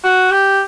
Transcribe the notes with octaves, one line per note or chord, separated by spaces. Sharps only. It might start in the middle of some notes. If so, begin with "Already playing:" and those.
F#4
G4